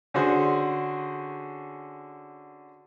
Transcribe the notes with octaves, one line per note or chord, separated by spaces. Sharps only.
D3 C#4 F#4 G#4 C5